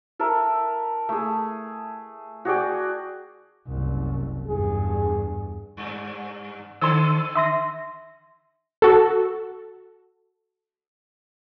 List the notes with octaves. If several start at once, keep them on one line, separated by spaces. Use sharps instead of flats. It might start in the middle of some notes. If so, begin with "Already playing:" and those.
A4 A#4 E5
A3 G#4
F#4 G#4 D5 G5
F#1 C2
E2 G2 G#4
G2
D3 A4 C6 E6
E5 C6 A#6
F#4 A4